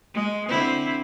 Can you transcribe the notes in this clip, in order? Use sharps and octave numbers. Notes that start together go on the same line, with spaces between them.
G#3
D3 C4 E4